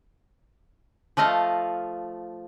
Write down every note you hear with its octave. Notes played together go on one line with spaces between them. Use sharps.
F3 A3 D#5 F5